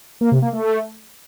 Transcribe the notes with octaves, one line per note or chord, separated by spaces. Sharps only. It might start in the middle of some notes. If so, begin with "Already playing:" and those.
A#3
C3
A#3
A3